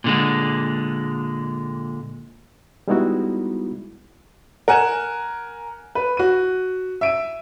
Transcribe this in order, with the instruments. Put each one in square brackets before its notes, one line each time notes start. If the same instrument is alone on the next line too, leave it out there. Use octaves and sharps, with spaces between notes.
[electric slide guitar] A#2 D3 G#3
[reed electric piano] G3 G#3 B3 D#4 E4 F#4
[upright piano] A#4 F#5 G#5 F#6 E7
B4
F#4 D#7
E5 D7 D#7